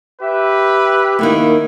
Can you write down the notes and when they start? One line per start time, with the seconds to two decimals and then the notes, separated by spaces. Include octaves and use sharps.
0.21 G4 B4 E5
1.19 D#3 A#3 B3 E4